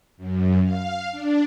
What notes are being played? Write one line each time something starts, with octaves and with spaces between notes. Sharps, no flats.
F#2
F5
D4